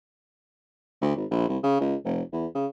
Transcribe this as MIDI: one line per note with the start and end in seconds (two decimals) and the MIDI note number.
1.01 1.15 38
1.16 1.25 32
1.31 1.48 34
1.48 1.58 36
1.63 1.80 49
1.80 1.95 37
2.05 2.22 29
2.33 2.46 40
2.55 2.66 49